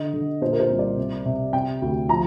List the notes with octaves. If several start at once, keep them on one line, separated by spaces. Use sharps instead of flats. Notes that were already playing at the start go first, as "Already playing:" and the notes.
Already playing: D3 D#5
D3
A#2 C5
A#4
C5
C2
D5
C3
C3
C3 G5
D2
F3 A#5